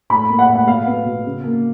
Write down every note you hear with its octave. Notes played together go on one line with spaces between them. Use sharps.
A2 B5
A#3
F#5
A2
F#5
B2 F5
B3
B2
C#3
A#3